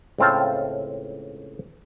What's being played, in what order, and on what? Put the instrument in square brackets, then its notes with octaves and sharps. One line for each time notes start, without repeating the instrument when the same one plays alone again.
[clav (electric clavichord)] C#2 A2 C4 F5 A5